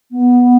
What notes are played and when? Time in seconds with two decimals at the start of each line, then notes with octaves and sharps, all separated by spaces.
0.12 B3